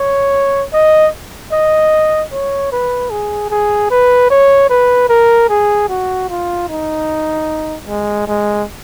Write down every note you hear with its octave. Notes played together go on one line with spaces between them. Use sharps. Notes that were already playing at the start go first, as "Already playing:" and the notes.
Already playing: C#5
D#5
D#5
C#5
B4
G#4
G#4
B4
C#5
B4
A#4
G#4
F#4
F4
D#4
G#3
G#3